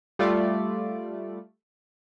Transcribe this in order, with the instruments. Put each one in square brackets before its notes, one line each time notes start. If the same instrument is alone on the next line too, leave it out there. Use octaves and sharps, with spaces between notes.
[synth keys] G3 A3 F4 D5